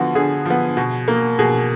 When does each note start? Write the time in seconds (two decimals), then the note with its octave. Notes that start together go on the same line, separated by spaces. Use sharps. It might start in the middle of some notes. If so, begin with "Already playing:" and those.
Already playing: D3 F3 B3 F#4
0.15 D3 G#4
0.46 F3 B3
0.77 B2
1.08 A#3
1.39 B2 G#4